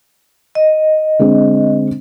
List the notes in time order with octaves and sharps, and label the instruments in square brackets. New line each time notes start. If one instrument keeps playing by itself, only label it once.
[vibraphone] D#5
[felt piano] D3 G#3 C4